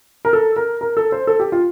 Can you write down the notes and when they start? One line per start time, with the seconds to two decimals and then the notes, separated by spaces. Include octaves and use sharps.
0.25 A#4
0.33 A4
0.56 A#4
0.81 A#4
0.97 A4
1.12 C5
1.27 A4
1.40 G4
1.52 F4